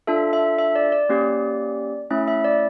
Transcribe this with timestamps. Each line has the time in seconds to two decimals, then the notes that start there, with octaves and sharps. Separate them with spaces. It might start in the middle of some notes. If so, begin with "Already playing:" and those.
0.07 D4 F4 A4 E5
0.33 E5
0.59 E5
0.75 D5
0.92 D5
1.09 A#3 C#4 G4
2.11 A3 C#4 E4 E5
2.28 E5
2.44 D5